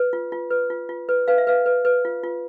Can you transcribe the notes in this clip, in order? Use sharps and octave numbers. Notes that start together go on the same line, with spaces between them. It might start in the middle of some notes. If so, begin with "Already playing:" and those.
Already playing: B4
F4
F4
B4
F4
F4
B4
B4 F5
E5
B4 F5
B4
B4
F4
F4